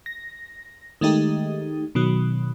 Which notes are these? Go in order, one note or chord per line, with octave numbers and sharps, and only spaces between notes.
A#6
D#3 G#3 A3 D#4 G4
B2 D#3 F#3